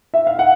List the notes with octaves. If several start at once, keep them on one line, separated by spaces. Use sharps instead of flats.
E5
F5
F#5